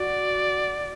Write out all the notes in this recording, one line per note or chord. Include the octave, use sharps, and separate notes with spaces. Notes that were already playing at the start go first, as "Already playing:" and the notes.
Already playing: F#4 D5